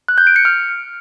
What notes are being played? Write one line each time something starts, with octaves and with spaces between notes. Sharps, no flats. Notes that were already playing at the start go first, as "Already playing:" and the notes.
F#6
G6
D7
C#7
F6